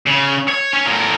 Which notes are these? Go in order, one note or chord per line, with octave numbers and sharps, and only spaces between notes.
C#3
C#5
C#4
A2 A#4